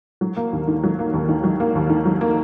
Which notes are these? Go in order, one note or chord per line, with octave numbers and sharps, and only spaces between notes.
F#3
A#3
D#2
D#3
F#3
A#3
D#2
D#3
F#3
A#3
D#2
D#3
F#3
A#3